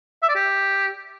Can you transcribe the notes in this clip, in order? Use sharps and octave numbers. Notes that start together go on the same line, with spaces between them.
E5
D5
G4